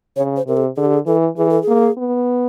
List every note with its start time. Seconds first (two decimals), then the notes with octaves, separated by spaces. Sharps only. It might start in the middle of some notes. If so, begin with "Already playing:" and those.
0.16 C#3 C#5
0.36 C5
0.47 C3 A#4
0.57 A4
0.77 D3 G#4
0.85 G4
0.94 G#4
1.07 E3 A4
1.37 E3 G#4
1.50 A4
1.62 G#4
1.68 A#3
1.98 B3